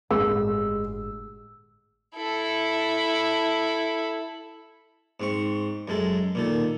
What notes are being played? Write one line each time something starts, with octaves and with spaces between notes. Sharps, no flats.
G1 A2 G#3 E6
E4 A4
G#2 C4 C#6
F#2 G#3 A4
A#2 D#3 A4